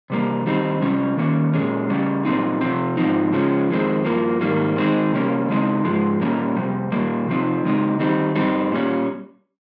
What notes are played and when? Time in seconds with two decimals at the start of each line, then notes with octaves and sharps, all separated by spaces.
0.10 C3 G3 A#3
0.46 D#3 G3 C4 D#4
0.82 C3 G3 C#4
1.17 D#3 A#3 C#4
1.54 A#2 G#3 C#4
1.90 C#3 G3 C#4
2.25 A#2 G3 C4 D#4
2.61 C3 F3 C4
2.97 G#2 F3 C4 D#4
3.33 C#3 F3 G#3 C#4
3.69 F2 D#3 G#3 C4
4.05 G2 F3 A#3
4.41 G#2 D#3 G3 A#3
4.76 D#3 G#3 C4 D#4
5.12 C3 G3 A#3 C#4
5.49 C#3 G#3 C4 D#4
5.84 G#2 F3 G#3
6.20 A#2 G3 A#3 C#4
6.56 F2 C3 G3
6.92 A#2 G3 A#3
7.28 C3 F3 C4 D#4
7.64 C#3 G#3 C4 D#4
8.00 D#3 G3 C4 D#4
8.36 G2 G3 C4 D#4
8.72 A#2 G3 C#4